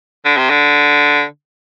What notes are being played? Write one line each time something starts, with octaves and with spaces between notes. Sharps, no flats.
D3
C3
D3